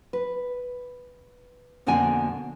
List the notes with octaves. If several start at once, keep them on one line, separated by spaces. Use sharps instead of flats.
B4
F2 B2 D3 A#3 D5 G#5